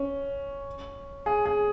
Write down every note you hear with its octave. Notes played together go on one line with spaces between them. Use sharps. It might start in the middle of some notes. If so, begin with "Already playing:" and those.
Already playing: C#4
G#4
G#4